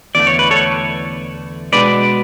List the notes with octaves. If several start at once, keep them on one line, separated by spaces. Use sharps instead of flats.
E2 D3 A3 D5
C#5
B4
A4 C#5
B2 G#3 D4 B4 D5